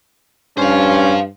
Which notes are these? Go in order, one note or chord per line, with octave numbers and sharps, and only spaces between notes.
G2 C#4 C5 F5